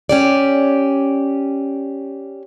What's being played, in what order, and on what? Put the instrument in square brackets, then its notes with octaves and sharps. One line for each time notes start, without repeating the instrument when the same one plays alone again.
[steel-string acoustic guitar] C#4 G4 D5